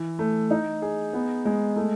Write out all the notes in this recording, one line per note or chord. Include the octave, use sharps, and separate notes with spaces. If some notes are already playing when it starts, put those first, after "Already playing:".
Already playing: E3
A3
D#4
G#4
B3
G#3
A3